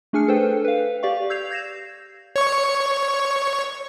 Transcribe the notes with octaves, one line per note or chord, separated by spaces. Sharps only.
A3 D4 G#4 G#5 F6 C#7
A4 B4 C5 G5
B4 F5
G4 D5 F5 C#6
E6 G6 G#6 C7 F7
G6 G#6 A#6 C7 E7
C#5 C#6